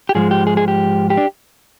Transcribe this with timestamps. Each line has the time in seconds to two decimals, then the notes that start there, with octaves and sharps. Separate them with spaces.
0.09 G4
0.15 G#2 F3 G#3 G#4
0.31 G4
0.47 G#4
0.57 G#4
0.68 G4
1.10 G4
1.17 D4